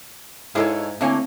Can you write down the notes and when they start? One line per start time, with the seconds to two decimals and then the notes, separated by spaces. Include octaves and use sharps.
0.55 G#2 G#3 E4 G#4 A4 C#5 F5
1.01 D3 E3 A3 A#3 C4 C#5 F5 G#5